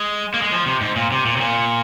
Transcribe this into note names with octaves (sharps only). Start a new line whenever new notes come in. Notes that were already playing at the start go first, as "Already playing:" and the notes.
Already playing: G#3
A#3
G#3
F3
C3
G#2
A#2
C3
A#2
C3
A#2